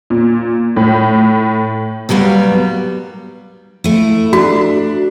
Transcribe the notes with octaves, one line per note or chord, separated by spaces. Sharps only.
A#2
A2
D#2 F#3 G3 B3 F5
A3 E4
D4 F#4